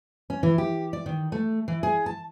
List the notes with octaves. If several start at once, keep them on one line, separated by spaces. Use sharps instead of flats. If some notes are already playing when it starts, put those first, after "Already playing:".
C#4
E3
G4
D5
D#3
A3
E3
G#4
A5